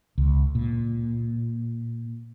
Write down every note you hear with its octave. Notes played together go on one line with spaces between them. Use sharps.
C#2
A#2